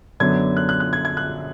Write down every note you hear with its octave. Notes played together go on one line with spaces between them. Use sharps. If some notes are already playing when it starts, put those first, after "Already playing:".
F#2 D3 F#3 B3 D4 G#6
F#6
F#6
F#6
G#6
G#6
F#6